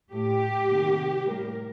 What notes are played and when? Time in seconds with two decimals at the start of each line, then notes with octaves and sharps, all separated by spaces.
0.12 A2 A3 G4
0.69 C3 D#3 A#3
1.25 A2 G3 A#3 A#4